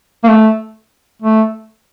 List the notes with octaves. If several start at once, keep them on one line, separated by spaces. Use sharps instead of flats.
A#3
A3
A3